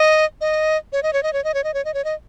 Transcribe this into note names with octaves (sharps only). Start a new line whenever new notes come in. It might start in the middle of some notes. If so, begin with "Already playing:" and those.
Already playing: D#5
D#5
C#5
D#5
C#5
D#5
C#5
D#5
C#5
D#5
C#5
D#5
C#5
D#5